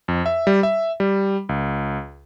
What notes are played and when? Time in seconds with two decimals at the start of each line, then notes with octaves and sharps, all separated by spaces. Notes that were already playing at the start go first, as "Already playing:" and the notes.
0.08 F2
0.26 E5
0.47 G3
0.63 E5
1.00 G3
1.49 C#2